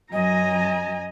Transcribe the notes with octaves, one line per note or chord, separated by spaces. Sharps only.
F#2 D#5 G#5 A#5